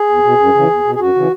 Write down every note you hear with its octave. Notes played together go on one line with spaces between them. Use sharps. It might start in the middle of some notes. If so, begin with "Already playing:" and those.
Already playing: G#4
E2
B2
F#2
C#3 E3
E2
B2
G#4
F#2 F#4
C#3 E3